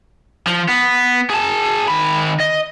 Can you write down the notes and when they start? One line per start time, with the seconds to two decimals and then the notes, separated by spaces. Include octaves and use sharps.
0.47 F3
0.69 B3
1.30 G#4 A5
1.88 D#3 B5
2.40 D#5